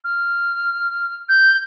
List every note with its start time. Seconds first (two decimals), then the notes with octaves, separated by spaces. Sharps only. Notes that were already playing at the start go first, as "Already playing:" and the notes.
0.04 F6
1.29 G6